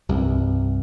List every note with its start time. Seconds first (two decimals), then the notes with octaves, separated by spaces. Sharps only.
0.09 C2 G2